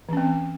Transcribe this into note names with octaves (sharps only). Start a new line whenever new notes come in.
E3 C4 C#4